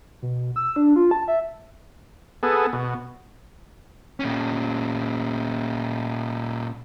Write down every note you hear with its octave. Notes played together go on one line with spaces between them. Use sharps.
B2
E6
D4
F4
A5
E5
B3 G#4 A4
B2
A#2 C#4